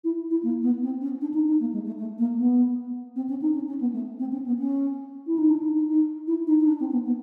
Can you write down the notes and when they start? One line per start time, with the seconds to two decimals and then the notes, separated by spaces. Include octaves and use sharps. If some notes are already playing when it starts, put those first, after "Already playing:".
0.04 E4
0.30 E4
0.43 A#3
0.62 B3
0.82 C4
1.01 C#4
1.21 D4
1.34 D#4
1.47 D#4
1.60 A#3
1.73 G#3
1.86 A3
1.98 A3
2.18 A#3
2.38 B3
3.16 C4
3.29 C#4
3.42 D#4
3.54 C#4
3.68 C#4
3.80 B3
3.93 A3
4.19 C4
4.32 C#4
4.46 B3
4.59 C#4
5.27 E4
5.38 D#4
5.50 D4
5.63 D#4
5.75 D#4
5.88 D#4
6.27 E4
6.47 D#4
6.60 D#4
6.67 D4
6.80 C4
6.92 B3
7.06 B3